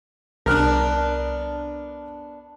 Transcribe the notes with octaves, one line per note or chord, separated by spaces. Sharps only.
C2 B3 D4 A#4 F6 F#6